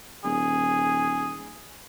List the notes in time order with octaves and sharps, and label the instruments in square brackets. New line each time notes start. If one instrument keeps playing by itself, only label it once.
[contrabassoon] D#1 [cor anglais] G#4